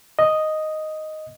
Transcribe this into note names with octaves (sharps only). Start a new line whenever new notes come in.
D#5